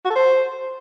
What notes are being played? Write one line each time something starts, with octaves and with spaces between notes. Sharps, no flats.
F#4
A4
C5